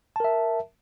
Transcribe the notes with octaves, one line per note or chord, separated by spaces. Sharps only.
A#4 E5 A5